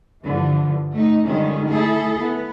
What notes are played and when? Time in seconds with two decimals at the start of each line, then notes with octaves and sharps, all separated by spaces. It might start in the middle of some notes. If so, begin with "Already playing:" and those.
0.22 G2 D3 E3 F3
0.92 A3 D#4
1.24 D3 D#3 F3 G3 G#3 C#4
1.68 A3 E4 G#4 A4
2.19 B3